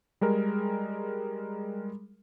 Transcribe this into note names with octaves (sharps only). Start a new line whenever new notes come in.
G3 G#3 G#4 A#4